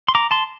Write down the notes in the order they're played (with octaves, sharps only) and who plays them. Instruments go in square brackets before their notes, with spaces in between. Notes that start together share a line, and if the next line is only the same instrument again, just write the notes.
[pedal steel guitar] C6
A#5 D6
A5 C6